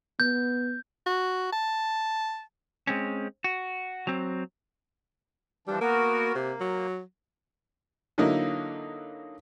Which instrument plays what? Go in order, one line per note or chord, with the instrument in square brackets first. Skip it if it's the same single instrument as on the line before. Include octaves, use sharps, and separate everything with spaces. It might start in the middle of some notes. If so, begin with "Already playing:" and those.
[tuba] B3 [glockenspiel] G6
[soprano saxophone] F#4
A5
[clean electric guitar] G#3 C4 C#4
F#4
F#3 C4
[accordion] E3 F3 D4 [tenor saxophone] G3
[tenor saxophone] A#3 [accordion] B3 F#4 A#4
[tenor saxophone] C3 [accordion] A#3
[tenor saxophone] F#3
[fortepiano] D3 F#3 A#3 D#4 E4